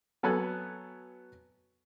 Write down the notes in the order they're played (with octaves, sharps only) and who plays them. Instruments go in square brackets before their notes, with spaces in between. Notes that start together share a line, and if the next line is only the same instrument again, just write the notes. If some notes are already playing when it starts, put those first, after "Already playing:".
[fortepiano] F#3 B3 A4 G#5 F#6